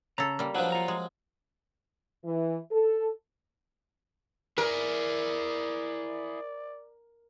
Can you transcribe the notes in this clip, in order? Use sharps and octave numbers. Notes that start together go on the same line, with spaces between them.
C#3 A4 A#5
G3 A#3
F3 F#3 D4 B4
F4 A#5
G#3
E3
A4
E4 G#4 A#4 D5